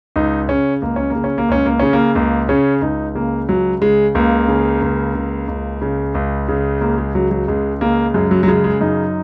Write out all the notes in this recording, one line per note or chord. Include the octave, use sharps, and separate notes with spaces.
C#2 D#4
C#3 C#4
C#2 A#3
C#4
A#3
C#3
C#4
A#3
C#2 C#4
A#3
C#3 C#4
A#3
C#2 A#3
C#3 C#4
C#2 D#4
C#3 A#3
C#2 F#3
C#3 G#3
C#2 A#3
C#3
C#2
C#3
C#2
C#3
C#2
C#3
C#2 A#3
G#3
C#3 F#3
F#3
C#2 G#3
C#3 A#3
F#2 G#3
F#3
F#3
C#3 G#3
G#3
F#2 D#4